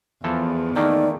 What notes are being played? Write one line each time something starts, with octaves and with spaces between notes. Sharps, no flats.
E2 E3 F3 A4
D#3 A3 A#3 D#4 D5